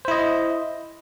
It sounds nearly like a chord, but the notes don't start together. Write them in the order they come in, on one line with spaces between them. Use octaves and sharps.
C5 E4 D#5